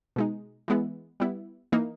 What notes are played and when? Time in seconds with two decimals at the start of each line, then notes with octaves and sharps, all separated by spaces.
0.16 B2 G#3 D#4
0.68 E3 G#3 B3 E4
1.20 G3 B3 E4
1.72 E3 A#3 D#4